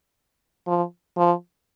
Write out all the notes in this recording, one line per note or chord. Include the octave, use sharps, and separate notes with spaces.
F3
F3